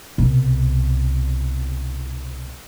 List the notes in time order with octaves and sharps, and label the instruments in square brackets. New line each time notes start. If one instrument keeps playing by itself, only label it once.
[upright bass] C2 B2